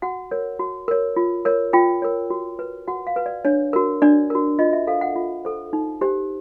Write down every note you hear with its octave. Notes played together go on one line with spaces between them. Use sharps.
F#4 F#5
A#4 C#5
F#4
A#4 C#5
F4
A#4 C#5
F4 G5
A#4 C#5
F#4
B4
F#4 F#5
F5
B4
D5
D4 C#5
F#4 A#4
D4 D5
F#4 A#4
F4 D#5
E5
A4 C5 F5
F#5
F4
A4 C5
D#4
G4 C5